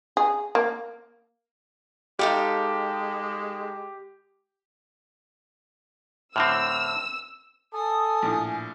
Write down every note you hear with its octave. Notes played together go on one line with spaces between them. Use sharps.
G#4
A#3
G#3 D#4 G4 A4 F5
A2 D3 C4 E6 F6
A4 G#5 D#6
A#1 A2